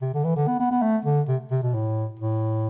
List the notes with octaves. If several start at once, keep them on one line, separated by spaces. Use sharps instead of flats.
C3
D3
E3
D3
B3
B3
B3
A3
D3
C3
C3
B2
A2
A2